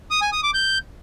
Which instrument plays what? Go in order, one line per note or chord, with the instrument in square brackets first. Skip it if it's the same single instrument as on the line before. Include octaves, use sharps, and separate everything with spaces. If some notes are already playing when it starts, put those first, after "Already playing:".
[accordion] D#6
G#5
D#6
D6
G6